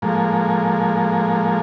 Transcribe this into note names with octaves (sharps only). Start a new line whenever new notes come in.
A2 F3 G#3 A#3